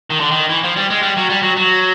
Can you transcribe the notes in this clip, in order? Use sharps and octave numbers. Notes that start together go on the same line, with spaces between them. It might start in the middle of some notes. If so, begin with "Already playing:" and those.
D#3
D3
D#3
E3
F3
G3
G#3
G3
F#3
G3
F#3
F#3